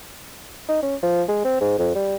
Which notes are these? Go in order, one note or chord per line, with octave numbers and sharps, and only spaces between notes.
D#4
C#4
F3
G#3
C4
G#2
F2
G3